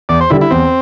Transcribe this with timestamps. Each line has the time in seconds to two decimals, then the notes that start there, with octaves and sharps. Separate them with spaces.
0.09 E2 D5
0.21 C5
0.30 D3 G3 E4
0.41 E4
0.51 E2 C4